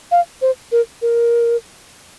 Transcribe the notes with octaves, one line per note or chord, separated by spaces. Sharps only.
F5
C5
A#4
A#4